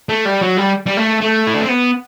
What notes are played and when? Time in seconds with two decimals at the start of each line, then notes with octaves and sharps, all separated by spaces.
0.09 A3
0.25 G3
0.41 F#3
0.57 G3
0.86 G3
0.97 A3
1.21 A3
1.47 E4
1.54 D4
1.61 C4
1.69 B3